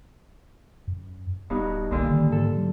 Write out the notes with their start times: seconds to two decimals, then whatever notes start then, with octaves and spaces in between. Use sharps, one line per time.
0.87 F#2
1.50 D1 G2 B2 D#4
1.91 A#1 A#2 D3
2.07 D#3
2.32 G#2 A4
2.57 F#3